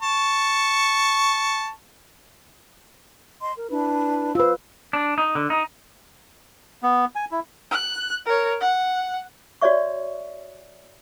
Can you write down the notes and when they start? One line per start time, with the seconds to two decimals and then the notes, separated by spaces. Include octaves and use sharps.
0.03 A5 C#6
3.41 D#5 C6
3.56 A#4
3.70 D4 E4 B4
4.35 F4 B4 C5 E6
4.93 D4
5.18 D#4
5.35 D3
5.50 D#4
6.83 B3
7.15 G#5
7.31 E4
7.71 F#6
8.26 A#4 C#5
8.61 F#5
9.61 F#4 C#5 D5 E5 C#6